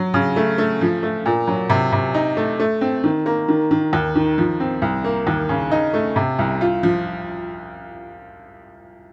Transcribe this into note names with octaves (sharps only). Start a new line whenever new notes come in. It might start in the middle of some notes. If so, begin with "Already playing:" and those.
Already playing: F#3
C#3
A3
A3
F3
A3
A#2
F#3
C3
C3
D#4
A3
A3
C4
D#3
A#3
D#3
D#3
D#2
D#3
F3
C4
C2
A#3
D#2
C#3
D#4
A3
C3
C2
F4
F3